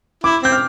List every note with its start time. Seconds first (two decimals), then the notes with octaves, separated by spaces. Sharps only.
0.24 E4 D6
0.42 C4 G6
0.52 F6